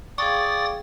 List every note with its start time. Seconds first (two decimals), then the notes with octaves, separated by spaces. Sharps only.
0.18 G#4 D5 F5 G5 C#6 D#6 A6